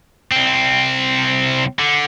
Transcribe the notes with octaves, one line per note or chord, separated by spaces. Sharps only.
C2 C4
D3